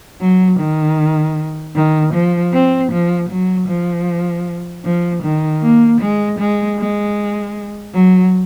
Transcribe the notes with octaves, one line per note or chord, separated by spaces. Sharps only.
F#3
D#3
D#3
F3
C4
F3
F#3
F3
F3
D#3
A#3
G#3
G#3
G#3
F#3